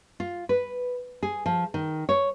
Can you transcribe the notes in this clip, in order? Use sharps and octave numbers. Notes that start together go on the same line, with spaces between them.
F4
B4
G#4
F3
D#3
C#5